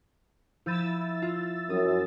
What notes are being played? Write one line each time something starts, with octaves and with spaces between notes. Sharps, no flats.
F3 E4 E6 G6 A6 D#7
F4
F#2 D#6